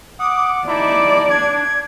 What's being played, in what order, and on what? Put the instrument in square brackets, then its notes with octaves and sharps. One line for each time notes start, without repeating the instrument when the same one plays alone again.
[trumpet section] F#5 D6 [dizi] D#6
[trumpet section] D#4 E4 A5 [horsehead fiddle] D5 [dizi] D6
[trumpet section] D4 [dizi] G#6